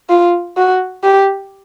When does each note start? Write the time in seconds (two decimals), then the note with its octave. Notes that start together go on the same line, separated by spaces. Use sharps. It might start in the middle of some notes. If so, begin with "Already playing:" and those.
0.09 F4
0.57 F#4
1.04 G4